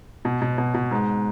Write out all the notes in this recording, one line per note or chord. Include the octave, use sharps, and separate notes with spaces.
B2
B2
B2
B2
G#2